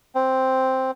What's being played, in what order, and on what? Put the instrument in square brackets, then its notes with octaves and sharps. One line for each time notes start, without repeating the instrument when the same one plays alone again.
[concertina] C4